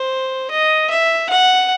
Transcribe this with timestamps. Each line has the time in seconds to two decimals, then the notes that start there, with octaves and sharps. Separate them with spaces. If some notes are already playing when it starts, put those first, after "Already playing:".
Already playing: C5
0.51 D#5
0.90 E5
1.30 F#5